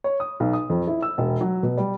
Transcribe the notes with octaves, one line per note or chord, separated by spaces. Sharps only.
C#5
D#6
B1
D#6
F2
E4
E6
E1
F#3
B2
G3